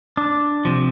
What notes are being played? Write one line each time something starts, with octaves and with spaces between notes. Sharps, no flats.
D4
C3 F3